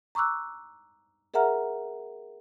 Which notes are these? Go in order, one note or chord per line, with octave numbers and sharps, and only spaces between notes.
A#5 C#6 D6 E6 F#6
G#4 A#4 E5 F#5 A#5 F6